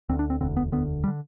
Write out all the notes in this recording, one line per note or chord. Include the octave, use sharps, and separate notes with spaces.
D2 D3 C4
D4
C4
E1 D2 D3 C4
B3
E1 D2 D3 B3
G3
D3